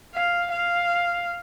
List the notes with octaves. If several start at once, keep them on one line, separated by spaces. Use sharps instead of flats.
F5
F5